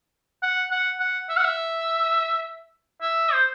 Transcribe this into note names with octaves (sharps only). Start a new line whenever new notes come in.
F#5
F#5
F#5
E5
F#5
E5
E5
C5